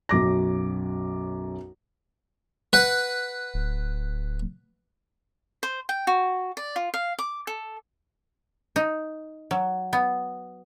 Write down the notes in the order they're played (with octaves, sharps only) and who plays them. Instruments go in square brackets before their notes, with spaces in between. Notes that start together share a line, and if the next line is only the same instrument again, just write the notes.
[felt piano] B1 F#2 D6 A#6
[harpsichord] B4 F#5
[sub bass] D1
[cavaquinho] C5
G5
F#4
D5
F4
F5
D6
A4
[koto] D#4
F#3
B3